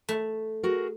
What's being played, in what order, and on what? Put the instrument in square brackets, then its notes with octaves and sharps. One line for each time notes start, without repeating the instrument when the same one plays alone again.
[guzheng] A3
[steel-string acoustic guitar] F#4 G#4 A#4